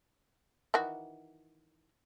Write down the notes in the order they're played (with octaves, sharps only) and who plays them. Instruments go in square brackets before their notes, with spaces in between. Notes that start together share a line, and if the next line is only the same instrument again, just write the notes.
[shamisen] D#3 E3 F#4